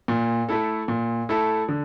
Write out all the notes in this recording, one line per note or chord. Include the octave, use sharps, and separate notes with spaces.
A#2
A3 E4 A4
A#2
A3 E4 A4
D3